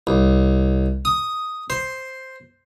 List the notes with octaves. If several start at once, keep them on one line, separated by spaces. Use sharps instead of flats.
C2
D#6
C5